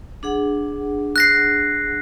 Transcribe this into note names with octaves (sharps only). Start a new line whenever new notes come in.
D4 G#4 F#5
F#6 A#6 C7